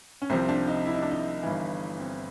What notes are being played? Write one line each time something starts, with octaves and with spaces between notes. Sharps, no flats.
C#4
C2 C3 F3 C4
D4
D#4
E4
D#4
D4
D#4
G1 G2 E3
C4